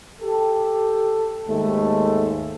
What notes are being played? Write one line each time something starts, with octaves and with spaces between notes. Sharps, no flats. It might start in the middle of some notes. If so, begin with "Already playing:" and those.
G4 A4
D#2 G#2 G#3 A3 A4